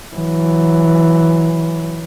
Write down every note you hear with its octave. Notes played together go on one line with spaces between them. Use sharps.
E3 F#3